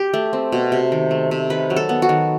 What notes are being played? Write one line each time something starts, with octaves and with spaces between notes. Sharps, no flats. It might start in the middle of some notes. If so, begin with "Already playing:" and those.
Already playing: G4
A3
C4
B2
C3
D#3
A3
C3
D#3 B4
F#3
A4
B3
F#4
D#3